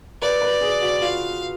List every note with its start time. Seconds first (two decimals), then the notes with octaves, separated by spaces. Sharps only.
0.22 B4 D5
0.42 B4
0.61 G#4
0.82 F#4
1.02 F4 F5